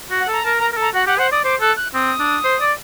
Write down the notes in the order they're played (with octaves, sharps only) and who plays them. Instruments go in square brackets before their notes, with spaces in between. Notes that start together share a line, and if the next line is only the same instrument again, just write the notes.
[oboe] F#4
[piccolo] F#5
[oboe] A4 [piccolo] A#5
[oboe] A#4 [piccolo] A5
[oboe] A#4 [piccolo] A#5
[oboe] A#4
[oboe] A4 [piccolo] A#5
[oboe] F#4 [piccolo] F#5
[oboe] G4 [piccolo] F#5
[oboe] C5 [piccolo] F#5
[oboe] D5 [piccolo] D#6
[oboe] C5 [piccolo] D6
[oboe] A4 [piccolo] F#6
[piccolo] F#6
[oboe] C4 [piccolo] D#6
[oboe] D4
C5
D5